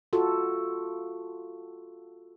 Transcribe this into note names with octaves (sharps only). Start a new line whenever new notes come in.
F4 F#4 A4